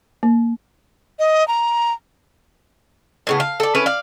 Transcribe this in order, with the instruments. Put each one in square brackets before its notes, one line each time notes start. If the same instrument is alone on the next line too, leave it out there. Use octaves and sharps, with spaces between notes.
[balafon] A#3
[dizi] D#5
A#5
[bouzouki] A2 C#3 B3
F5
A4 D5
C#4 E4 A4 B4
D5 F5